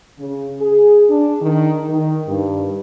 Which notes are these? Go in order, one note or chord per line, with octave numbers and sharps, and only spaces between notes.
C#3
G#4
D4
D#3
D#3
G2